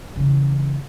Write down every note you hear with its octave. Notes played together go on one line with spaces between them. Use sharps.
C#3 E3